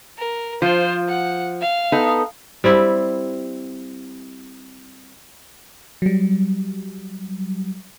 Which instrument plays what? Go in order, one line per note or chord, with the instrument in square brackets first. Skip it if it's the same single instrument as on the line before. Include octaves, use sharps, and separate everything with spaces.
[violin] A#4
[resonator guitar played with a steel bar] F3 [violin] F4 C5
[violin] F#5
F5
[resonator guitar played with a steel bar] B3 D#4 A4
[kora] G3 C4 E4
[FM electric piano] F#3 G3